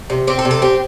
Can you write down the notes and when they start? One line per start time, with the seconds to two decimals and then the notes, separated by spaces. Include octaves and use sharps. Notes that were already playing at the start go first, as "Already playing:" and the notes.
0.10 C3
0.27 C4 G4
0.39 A4
0.45 C3
0.51 A4
0.62 C4 G4